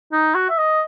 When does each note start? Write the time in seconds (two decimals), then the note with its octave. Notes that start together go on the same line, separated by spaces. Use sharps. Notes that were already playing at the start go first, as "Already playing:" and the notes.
0.12 D#4
0.35 F#4
0.50 E5
0.58 D#5